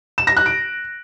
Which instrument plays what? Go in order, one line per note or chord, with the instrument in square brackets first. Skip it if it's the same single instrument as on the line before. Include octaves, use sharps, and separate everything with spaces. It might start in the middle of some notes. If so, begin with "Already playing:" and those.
[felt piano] E7
A#6
F#6
D7